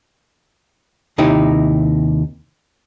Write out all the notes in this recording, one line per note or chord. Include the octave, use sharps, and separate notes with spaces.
D#2 C3 D#4 E4 G4